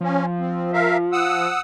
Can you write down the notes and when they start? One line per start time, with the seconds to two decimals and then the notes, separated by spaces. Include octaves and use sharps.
0.01 F3 C#4
0.40 C4
0.73 A#4 E5 F5
1.12 F#5 D#6 E6